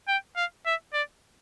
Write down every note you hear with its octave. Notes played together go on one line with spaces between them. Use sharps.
G5
F5
E5
D5